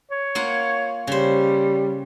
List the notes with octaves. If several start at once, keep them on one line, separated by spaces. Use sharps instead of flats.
C#5
A#3 F4 F#5
C#3 G3 C5